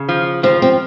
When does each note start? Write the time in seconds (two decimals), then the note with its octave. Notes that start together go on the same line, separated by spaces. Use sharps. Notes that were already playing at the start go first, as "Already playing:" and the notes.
Already playing: C#3
0.09 F3
0.43 F3 C4
0.62 C4